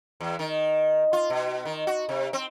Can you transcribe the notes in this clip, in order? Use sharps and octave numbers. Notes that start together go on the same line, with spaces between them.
E2
D#3
F4
B2
D#3
F#4
C3
C4